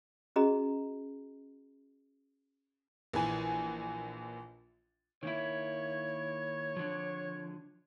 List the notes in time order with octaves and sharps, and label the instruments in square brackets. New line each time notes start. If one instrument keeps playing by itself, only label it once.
[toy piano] C#4 F#4 G#4 D#5 A#5
[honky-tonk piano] A#1 E3 G#5
[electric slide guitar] D#3 A#3 E4 [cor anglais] C#5 [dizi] G#6
[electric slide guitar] D3 F3